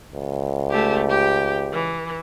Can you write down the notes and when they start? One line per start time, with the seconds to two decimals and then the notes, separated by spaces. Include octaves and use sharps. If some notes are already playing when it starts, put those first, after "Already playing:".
0.14 C#2
0.70 A3 G4
1.09 G4 G5
1.73 E3